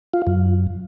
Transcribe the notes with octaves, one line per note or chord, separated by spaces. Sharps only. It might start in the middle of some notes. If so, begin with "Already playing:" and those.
F4
F#2